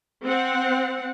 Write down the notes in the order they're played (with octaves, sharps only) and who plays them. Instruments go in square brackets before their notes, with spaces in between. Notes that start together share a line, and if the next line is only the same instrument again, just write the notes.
[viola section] C4 F#5